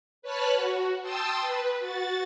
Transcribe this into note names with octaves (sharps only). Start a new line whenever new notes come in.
B4 C#5 A5 B5 F6 F#6
F#4
G5 A5 C6 D#6 E6 A6
B4
F#4 A6